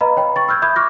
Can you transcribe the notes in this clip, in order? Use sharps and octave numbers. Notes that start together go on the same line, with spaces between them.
B4 D#5 F5 A#5 B5
C#5 G5 B5
B5 C#6 A6
E6 F6 G6 G#6
E5 B5 D#6 G6 G#6
C#6 D6 F6 F#6 A#6